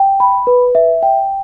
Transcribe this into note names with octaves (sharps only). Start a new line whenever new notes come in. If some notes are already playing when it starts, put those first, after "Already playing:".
Already playing: G5
B5
B4
E5
G5